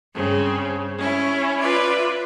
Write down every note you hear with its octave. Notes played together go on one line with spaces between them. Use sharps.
G2 C#3 C4
C#4 E4
F4 B4 D5 E5